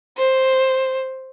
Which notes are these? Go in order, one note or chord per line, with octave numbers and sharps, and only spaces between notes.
C5